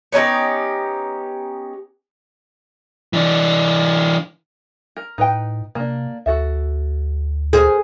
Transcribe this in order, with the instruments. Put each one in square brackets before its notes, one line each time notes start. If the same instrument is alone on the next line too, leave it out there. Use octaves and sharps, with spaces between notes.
[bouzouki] B3 C#4 D#4 G4
[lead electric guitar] E3 D4
[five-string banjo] A#4
[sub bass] A2 [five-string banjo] D#4 B4 G5
[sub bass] C3 [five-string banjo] A#3 D4
[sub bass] D2 [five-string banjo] F#4 A4 E5
[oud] G#4 [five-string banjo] A#4 C5